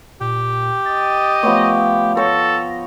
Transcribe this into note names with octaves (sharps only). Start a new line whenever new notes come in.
A#2 G4 G5
D#5 A6
F3 A3 B3 C#5
A4 C#5 G5 A#6